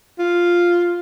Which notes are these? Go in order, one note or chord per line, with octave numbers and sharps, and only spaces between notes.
F4